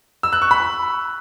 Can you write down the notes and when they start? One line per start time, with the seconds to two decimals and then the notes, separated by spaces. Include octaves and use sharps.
0.23 E6
0.33 F#6
0.42 C#6
0.51 B5